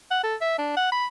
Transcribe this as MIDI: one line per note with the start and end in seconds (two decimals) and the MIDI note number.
0.11 0.20 78
0.24 0.35 69
0.41 0.57 76
0.58 0.74 62
0.77 0.92 78
0.92 1.06 83